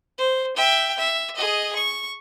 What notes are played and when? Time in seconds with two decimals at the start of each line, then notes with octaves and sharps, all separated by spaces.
0.18 C5
0.56 E5 G5
0.98 E5
1.35 G#4 D#5
1.75 C#6